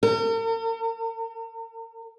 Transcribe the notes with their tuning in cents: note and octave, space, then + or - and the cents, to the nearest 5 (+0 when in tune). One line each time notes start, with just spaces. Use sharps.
A#4 -45